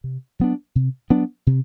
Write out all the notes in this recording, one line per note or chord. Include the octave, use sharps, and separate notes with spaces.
C3
F#3 B3 D4
C3
F#3 B3 D4
C3